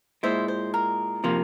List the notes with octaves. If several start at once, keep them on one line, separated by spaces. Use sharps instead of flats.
A#2 G#3 E4 C5 E5
C5
A#4
C3 F3 A#3